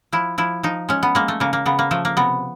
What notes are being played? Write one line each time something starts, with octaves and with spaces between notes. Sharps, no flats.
F3 E4
F3 E4
F3 D#4
G#3 C#4
B3
G#3 A#3
A3
C#3 A#3
A#3
C#3 B3
A#3
F3 A3
A#3
C3 B3